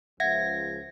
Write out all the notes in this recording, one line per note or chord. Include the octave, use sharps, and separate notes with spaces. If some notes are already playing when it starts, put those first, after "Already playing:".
C#2 C#3 F3 E5 F#5 G#6 A#6